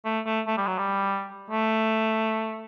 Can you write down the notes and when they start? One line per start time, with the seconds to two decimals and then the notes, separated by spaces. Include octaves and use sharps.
0.05 A3
0.26 A3
0.47 A3
0.57 G3
0.67 F#3
0.78 G3
1.50 A3